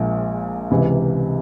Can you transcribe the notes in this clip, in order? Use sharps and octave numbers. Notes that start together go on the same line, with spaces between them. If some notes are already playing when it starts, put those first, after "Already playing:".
Already playing: A#1 A#2 F3 G#3
C#2 C3 E3